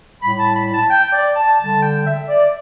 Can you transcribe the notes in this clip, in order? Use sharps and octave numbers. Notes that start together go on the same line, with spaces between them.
A2 G3 B5
A5
B5
A5
G5
D5
A5
D3 G3 A5
G5
E5
D5